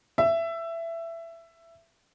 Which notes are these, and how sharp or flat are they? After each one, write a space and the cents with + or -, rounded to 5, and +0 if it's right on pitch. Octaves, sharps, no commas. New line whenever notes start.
E5 +15